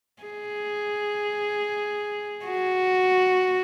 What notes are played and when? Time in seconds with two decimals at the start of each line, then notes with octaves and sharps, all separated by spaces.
0.23 G#4
2.46 F#4